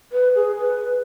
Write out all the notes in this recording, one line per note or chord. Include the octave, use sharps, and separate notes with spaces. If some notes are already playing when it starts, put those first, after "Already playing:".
B4
G#4
B4